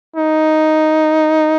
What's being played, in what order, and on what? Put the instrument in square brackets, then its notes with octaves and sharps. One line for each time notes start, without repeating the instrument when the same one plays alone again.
[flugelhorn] D#4